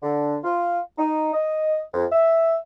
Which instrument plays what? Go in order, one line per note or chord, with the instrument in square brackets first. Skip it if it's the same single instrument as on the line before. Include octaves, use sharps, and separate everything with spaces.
[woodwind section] D3
F4
D#4
D#5
F2
E5